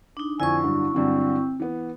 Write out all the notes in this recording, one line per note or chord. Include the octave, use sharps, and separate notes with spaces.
D4 D#4
F2 D3 E4 G#5 C#6
G2 D3 F#3 D4
G2 D3 F#3 C4
E3 B3